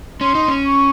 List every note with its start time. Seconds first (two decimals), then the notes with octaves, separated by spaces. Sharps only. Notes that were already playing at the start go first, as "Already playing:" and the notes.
0.20 C#4 C6
0.35 D#4
0.48 C#4
0.65 C#6